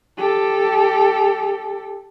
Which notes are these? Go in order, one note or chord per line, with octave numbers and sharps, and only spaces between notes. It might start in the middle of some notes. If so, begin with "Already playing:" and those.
G4 A4